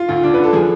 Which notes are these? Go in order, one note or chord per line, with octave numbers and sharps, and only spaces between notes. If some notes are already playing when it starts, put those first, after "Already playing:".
Already playing: F4
D2
D4
D3 B4
A4
F3 G#4